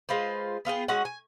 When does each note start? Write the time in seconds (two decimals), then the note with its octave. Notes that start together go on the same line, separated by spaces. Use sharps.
0.09 G#3 F4 B4 C5
0.65 B3 F4 G#4 G5
0.88 G#3 C#4 F#4 F#5
1.05 G#5